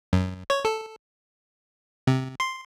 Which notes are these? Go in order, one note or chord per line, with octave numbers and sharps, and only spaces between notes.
F#2
C#5
A4
C3
C6